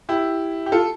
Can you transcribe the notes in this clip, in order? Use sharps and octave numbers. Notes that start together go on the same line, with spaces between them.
E4 G4
G4
F4 A4